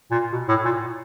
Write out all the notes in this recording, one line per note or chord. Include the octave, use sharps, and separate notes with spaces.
A#2
B2
A2
A#2